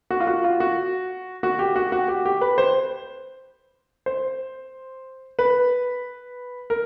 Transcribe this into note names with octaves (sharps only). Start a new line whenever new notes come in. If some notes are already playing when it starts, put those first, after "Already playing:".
F#4
F4
F#4
F4
F#4
F#4
G4
F#4
F#4
G4
G4
B4
C5
C5
B4
A#4